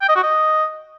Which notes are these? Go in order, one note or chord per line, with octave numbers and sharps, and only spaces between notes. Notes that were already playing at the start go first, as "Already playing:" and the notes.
G5
D#5
F#4
D#5